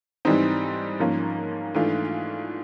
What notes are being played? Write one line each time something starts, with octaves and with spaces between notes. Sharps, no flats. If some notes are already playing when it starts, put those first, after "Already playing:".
G#2 E3 G3 C4 D#4
G#2 F3 A#3 C#4
G#2 E3 A3 D4 F4